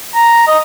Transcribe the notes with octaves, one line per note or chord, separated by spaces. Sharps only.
A#5
D#5